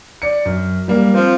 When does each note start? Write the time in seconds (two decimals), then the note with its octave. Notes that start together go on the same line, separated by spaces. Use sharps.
0.22 D5 C#7
0.45 F#2
0.88 G3 A#3
1.14 F3 C4